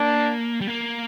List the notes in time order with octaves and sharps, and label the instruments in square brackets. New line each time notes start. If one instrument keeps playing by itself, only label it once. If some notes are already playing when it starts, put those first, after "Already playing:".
Already playing: [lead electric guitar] A#3 [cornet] D4
[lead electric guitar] G3
A#3